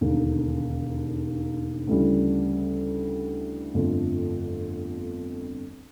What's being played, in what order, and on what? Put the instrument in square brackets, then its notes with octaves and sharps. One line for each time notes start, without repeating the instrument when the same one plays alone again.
[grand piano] E1 D#2 D3
D2 C#3 E3 G3
G1 F2 D3 F3 A3